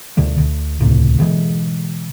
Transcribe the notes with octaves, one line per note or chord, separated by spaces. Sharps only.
D2 B2 D3 G3
D2
D#1 C#2 A2 C3
B2 D3 E3 G#3